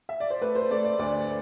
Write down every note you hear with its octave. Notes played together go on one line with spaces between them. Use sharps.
E5
D5
C5
A3 B4
C5
A3 D5
D5
D2 D5